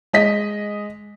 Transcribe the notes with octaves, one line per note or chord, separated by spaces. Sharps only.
G#3 D#5 B6